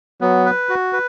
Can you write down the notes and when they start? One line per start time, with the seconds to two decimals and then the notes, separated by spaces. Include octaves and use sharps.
0.21 F#3 B3
0.45 B4
0.69 F#4
0.93 B4